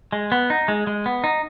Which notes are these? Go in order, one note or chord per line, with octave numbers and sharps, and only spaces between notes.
G#3
B3
D#4
G#3
G#3
B3
D#4